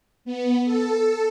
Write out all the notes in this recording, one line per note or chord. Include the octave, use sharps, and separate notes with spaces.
B3
A4